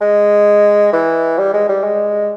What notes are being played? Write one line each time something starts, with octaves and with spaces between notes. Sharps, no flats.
G#3
E3
G3
G#3
G3
G#3